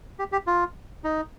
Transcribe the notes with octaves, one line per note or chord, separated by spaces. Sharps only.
G4
G4
F4
D#4